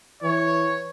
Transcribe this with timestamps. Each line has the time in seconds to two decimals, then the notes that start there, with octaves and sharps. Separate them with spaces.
0.23 E3 C#5